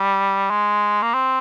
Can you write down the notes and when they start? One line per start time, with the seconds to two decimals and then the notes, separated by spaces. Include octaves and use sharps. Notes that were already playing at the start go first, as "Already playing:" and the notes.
Already playing: G3
0.50 G#3
1.03 A#3
1.14 C4